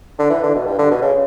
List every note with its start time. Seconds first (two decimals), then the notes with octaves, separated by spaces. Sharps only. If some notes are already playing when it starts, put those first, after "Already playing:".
0.19 D3
0.30 E3
0.43 D3
0.55 B2
0.66 G2
0.78 D3
0.91 B2
1.02 C#3